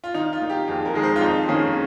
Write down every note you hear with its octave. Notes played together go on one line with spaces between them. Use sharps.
F4
D#3 D#4
F4
A#3 D#4
G4
F2 G#4
A#4
D#3 G#3 D#4 G#4
C5
F4
F2 D#4
D#3 A#3 C#4 G#4